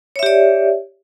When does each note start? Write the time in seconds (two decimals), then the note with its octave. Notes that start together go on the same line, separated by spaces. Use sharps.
0.16 C#5
0.19 E5
0.23 G4
0.26 D5